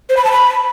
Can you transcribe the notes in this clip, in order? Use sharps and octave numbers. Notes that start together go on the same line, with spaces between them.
C5
B5
A5
B5